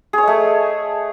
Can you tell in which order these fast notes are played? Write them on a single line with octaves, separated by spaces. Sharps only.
G#4 C#5 D#5 A3